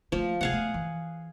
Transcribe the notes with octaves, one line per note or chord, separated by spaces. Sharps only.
F3 A3 A#3
C3 A3 G#4 F5 F#5
A3 B3
E3